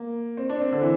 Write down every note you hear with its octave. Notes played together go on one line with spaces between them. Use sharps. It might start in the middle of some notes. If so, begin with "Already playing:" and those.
Already playing: A#3
C4
D4
C4
D3
E3